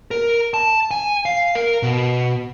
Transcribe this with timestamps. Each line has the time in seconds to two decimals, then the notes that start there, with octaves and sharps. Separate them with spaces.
0.11 A#4
0.54 A5
0.91 G#5
1.26 F5
1.55 A#4
1.83 B2